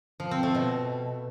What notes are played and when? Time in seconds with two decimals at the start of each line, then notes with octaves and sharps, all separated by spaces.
0.20 F3
0.31 C4
0.43 A3
0.55 B2